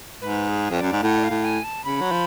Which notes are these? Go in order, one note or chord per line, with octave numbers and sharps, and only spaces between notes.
G#2 B4
G#4
F2 D5
F#2
G#2
A2 F#5
D5
F5
A2
G#5
A5
C#3 B5
F#3
F3